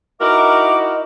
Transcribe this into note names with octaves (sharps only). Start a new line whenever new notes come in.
D#4 E4 F#4 A#4 D#5 E5 A#5 D6